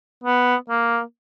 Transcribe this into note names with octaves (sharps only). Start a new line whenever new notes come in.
B3
A#3